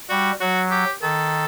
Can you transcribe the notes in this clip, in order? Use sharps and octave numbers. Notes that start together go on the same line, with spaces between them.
G3 F#4
F#3 F#4
G4
D#3 A4